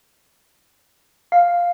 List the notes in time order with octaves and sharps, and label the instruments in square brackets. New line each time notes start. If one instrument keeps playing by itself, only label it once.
[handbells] F5